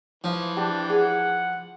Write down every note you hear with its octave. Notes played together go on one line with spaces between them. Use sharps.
E3 F3
D4 G4
G#4 F#5